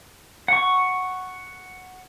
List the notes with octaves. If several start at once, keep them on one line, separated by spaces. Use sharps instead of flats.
F#5 C#6